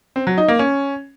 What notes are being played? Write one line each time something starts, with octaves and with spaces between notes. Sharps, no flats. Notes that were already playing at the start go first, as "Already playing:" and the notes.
C4
F#3
D#4
A#3
C#4